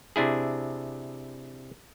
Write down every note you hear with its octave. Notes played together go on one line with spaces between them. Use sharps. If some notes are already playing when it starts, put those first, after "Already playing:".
C3 D4 E4 G#4